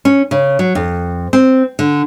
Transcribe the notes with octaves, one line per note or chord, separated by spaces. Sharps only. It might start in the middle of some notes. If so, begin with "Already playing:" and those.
C#4
C#3
F#3
F2
C4
D3